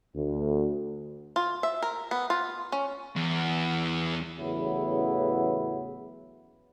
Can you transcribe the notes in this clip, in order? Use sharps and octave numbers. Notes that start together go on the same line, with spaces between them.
D2
F4
E5
A#4
B3
F4
C#4
E2
A1 E2 C#3 F#3 B3 E4